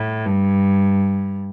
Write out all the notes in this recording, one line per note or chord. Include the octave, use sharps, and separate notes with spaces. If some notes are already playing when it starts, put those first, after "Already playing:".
Already playing: A2
G2